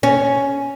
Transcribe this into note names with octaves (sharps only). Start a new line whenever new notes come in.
C#4